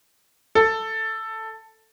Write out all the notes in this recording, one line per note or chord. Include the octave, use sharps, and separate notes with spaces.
A4